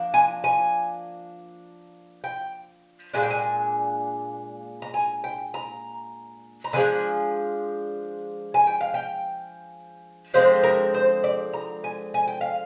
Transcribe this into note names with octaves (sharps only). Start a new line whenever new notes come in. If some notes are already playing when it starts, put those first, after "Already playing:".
Already playing: F3 A#3 D4
G#5
G#5
G5
A#2 G#3 D4 G#5
G5
G#5
A#5
G#5
G5
A#5
A#5
D3 F3 G#3 D4 G#5
G#5
G5
F5
G5
D3 F3 G#3 C4 C5
A#4
C5
D5
A#5
G#5
G#5
G5
F5